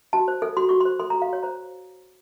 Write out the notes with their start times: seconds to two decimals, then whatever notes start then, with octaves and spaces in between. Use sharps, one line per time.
0.13 F#4 A5
0.28 C5
0.42 A4
0.57 F#4 C6
0.69 F#4 C#6
0.81 C6
0.85 C5
1.00 A4 C6
1.10 A#5
1.14 F#4
1.22 F5
1.28 F#4 C#5
1.43 C5 A#5